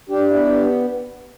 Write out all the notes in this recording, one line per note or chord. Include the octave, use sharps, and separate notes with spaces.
D4 G4
E4
B3
G4